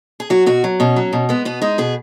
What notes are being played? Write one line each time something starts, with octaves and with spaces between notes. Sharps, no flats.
G#4
F#3 F#4
B2 F#4
F#3
B2 C#4
F#3
B2
G#3 B3
B2 B3
G#3 D#4
B2 G#4